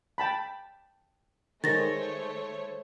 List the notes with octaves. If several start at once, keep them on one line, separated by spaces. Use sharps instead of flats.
G5 A5 B5
D#3 G#3 A3 C5 C#5 A6 A#6